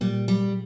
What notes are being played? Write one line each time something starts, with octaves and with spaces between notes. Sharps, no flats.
A#2 G3 A#3
G3